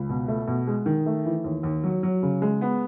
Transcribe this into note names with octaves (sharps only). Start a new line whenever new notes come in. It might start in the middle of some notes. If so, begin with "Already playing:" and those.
Already playing: C#2
B2
A3
B2
G#3
D#3
A3
E3
D#2
D#2
F#3
F#3
C#3
G#3
B3